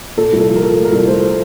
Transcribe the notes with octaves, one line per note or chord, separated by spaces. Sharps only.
A#2 A4
C2
A4
F3
A#4
F3 A4
A3
A#4
C2
A3 C5